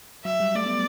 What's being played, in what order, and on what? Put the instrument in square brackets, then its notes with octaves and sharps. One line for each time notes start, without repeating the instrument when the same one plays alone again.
[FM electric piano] F#3 [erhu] E5
[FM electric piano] G3
[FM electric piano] A3 [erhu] D5
[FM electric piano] B3